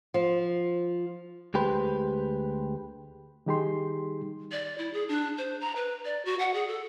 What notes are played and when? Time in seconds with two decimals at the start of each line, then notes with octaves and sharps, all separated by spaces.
0.14 F3
1.54 D2 G#3 G4 B4 C5
3.46 D#3 G3 D#4 G4 G#4 C6
4.52 D5
4.78 E4
4.94 G#4
5.09 D4
5.38 C5
5.61 A#5
5.76 B4
6.05 D5
6.25 F#4
6.39 F#5
6.54 G#4
6.68 A4